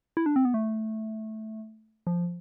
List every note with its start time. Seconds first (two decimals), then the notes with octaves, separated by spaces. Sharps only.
0.17 E4
0.26 D4
0.36 C4
0.45 B3
0.54 A3
2.07 F3